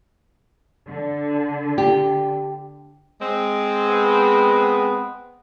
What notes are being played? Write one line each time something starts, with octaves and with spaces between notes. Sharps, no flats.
D3
G4
G#3 C4
B3